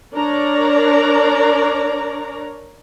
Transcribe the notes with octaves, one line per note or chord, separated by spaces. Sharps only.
D4 A#4 C#5 D5 A#5